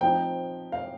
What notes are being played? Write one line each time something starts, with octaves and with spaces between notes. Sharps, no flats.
F3 C4 D#4 G5
F5